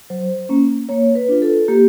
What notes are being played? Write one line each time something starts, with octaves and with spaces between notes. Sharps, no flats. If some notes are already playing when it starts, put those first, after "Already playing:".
F#3 C5
A#3 C#4
A#3 C#5
B4
D4 F4
A4
A#3 G4